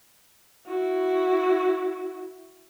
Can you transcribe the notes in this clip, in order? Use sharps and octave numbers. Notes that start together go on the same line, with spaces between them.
E4 F#4